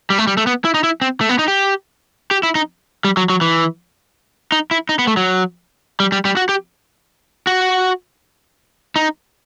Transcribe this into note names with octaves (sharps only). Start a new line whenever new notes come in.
G3
A3
G3
A3
B3
E4
D#4
E4
C4
A3
B3
D#4
G4
G4
E4
D#4
G3
F#3
F#3
E3
D#4
E4
D#4
B3
A3
F#3
G3
G3
G3
F#4
G4
F#4
D#4